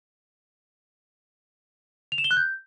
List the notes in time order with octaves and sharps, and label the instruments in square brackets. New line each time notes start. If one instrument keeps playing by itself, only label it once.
[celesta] F7
E7
G7
F#6
G6